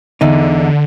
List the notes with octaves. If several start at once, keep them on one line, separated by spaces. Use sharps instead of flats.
E2 D3 D#4